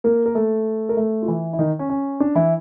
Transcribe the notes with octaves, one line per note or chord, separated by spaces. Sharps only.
A#3 A#4
A#4
A3 A4
A#4
A3 A4
F4
E3 E4
E4
D#3 D#4
C#4
C#4
D4
E3 E4